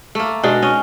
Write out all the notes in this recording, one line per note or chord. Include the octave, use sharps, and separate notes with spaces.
A3 A#3
B2 G#3 D4 D#4
C#4 D#5